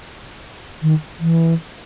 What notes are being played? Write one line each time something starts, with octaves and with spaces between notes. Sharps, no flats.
D#3
E3